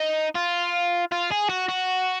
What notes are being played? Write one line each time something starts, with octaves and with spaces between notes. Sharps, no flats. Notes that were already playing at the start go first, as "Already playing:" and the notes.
Already playing: D#4
F4
F4
G#4
F#4
F#4